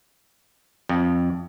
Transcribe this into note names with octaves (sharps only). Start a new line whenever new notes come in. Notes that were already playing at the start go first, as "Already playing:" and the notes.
F2